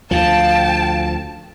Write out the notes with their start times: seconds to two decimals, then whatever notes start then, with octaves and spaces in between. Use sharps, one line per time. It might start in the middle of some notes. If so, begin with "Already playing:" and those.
0.11 D2 F3 F5 G5 A5